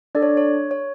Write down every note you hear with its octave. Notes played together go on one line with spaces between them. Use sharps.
D4 A4 D5
C#5
C#5
C#5